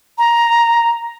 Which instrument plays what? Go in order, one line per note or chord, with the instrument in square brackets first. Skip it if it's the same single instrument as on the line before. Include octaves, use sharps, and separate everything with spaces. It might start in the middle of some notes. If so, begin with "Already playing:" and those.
[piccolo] A#5